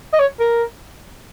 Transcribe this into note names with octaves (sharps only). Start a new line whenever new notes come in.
D#5
C#5
A#4